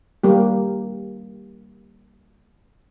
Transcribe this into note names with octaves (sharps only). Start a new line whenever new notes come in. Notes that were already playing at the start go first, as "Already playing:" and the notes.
G3 A#3 G4